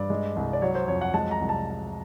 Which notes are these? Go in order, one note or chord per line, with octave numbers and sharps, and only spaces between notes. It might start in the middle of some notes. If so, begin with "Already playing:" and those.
Already playing: G2 D5
G#3
C2
D5
F#3 C#5
C5
F2 C#5
F#5
G#3 A5
A#5
C2
A5